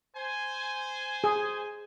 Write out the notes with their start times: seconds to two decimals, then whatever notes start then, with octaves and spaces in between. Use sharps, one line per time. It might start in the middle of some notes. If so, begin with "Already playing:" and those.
0.16 C5 G#5
1.24 G#4